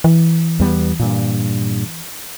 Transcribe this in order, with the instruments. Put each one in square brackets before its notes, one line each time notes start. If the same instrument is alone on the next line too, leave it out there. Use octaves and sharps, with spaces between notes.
[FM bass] E3
[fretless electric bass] E2 G3 B3
G2 A#2